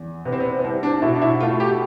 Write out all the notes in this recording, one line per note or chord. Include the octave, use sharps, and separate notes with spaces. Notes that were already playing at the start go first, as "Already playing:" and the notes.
Already playing: E2
C3 B3
C4
B3
B3
C2 C4
D4
B2 E4
D4
E4
A3 F4
G4